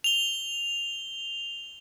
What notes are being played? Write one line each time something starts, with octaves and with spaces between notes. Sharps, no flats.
F7 G7